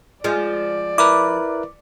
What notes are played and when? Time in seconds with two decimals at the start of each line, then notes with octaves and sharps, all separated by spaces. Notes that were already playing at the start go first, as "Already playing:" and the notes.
0.24 F3 G#3 D5
0.98 E4 A#4 B4 D6